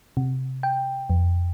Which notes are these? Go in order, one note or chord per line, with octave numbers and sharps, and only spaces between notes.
C3
G5
F2